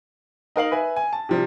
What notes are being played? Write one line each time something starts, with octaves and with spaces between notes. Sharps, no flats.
D#4 A#4 F5 F#7
B4 E5 G#5
G#5
A5
C3 F3 G3